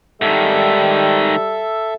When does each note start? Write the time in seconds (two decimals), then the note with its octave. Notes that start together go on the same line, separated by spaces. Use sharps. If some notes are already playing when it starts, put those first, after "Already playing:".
0.22 G#2 D#3 G3 A4 E5